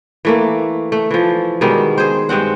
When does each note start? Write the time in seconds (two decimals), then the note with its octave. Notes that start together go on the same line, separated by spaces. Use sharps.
0.25 E3 A3 A#3
0.92 A3
1.11 E3 F3
1.61 B2 D#3 G3 G#3
1.98 G#4 C5
2.29 G2 G#3 C4 F#5